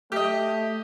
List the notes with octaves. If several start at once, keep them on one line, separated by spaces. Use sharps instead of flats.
A3 G4 D#5